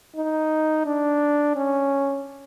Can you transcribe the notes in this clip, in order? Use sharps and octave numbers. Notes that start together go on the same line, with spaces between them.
D#4
D4
C#4